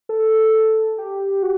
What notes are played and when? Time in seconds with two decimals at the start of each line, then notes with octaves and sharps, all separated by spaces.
0.09 A4
0.98 G4
1.43 F#4